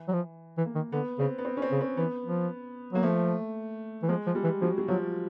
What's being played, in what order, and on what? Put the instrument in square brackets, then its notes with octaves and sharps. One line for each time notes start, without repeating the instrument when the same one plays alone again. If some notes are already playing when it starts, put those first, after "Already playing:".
Already playing: [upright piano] E3
[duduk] F#3
F3
E3
[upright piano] A#3
[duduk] D#3
[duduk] D3 [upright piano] B3
[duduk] C#3 [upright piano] C4
[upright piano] B3
C4
C#4
C4
[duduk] C#3
[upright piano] C4
[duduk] E3 [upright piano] B3
[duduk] F3
[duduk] F#3 [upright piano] A#3
[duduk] F3 [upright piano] A3
[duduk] E3
[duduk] F3 [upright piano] G#3
[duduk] F3
[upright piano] G3
[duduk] E3
[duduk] F3 [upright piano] F#3
[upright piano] F#3
[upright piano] F3 [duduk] F#3